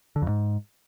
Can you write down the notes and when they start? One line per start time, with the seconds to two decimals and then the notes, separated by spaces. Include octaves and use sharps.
0.16 D3
0.22 F2
0.28 G#2